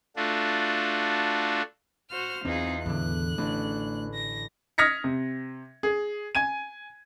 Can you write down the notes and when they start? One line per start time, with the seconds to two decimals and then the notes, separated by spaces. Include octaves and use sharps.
0.16 A3 D4 F4 F#4
2.11 F#4 C5 F6
2.45 E2 C4 D#4 F4 G#4
2.86 E2 A2 D3 F#6
3.38 A1 A3 C#4 D4
4.14 A#6
4.78 D#6 F6 G#6 A#6 B6 C#7
5.04 C3
5.83 G#4
6.35 G#5 G#6 D#7